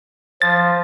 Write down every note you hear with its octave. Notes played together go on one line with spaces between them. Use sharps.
F3 A6